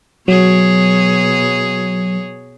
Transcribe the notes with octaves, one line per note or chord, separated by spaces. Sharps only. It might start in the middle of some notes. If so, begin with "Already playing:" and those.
B2 F#3 G#4 C#5